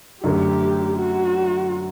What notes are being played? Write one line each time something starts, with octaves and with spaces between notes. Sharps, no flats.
F#2 D3 A3 G4
F#4